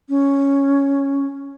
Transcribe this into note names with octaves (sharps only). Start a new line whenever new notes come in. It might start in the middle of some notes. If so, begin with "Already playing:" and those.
C#4